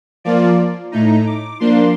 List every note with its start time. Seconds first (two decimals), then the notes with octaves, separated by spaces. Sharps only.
0.24 F3 A#3 F4 D5
0.92 A2 A3 D#4 A#5
1.26 D6
1.60 F3 A#3 D4 C6